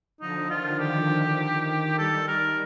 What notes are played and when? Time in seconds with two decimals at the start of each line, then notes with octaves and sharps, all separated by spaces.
0.21 D3 F3 D#4
0.50 D#3 F4
0.79 D#3 G4
1.10 D3
1.39 D#3
1.98 D#3 G3 A4
2.27 A#4